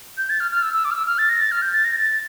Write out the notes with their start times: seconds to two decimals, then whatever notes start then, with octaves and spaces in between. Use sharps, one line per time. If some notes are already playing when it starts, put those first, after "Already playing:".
0.18 G6
0.30 A6
0.40 F6
0.51 F6
0.62 E6
0.73 E6
0.85 D6
0.91 F6
0.95 E6
1.06 F6
1.18 A6
1.29 A#6
1.40 A6
1.52 F6
1.62 G6
1.73 A6
1.85 A#6
1.96 A6